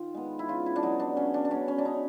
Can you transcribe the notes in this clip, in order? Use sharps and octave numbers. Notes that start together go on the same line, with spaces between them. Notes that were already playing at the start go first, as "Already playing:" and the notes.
Already playing: D#3 F4
G#3 B3
E4
C#3 F4
E4
D4
F#3 B3 D#4
D4
C#3 C#4
D4
D4
F#3 B3 C#4
C#4
D4
D#4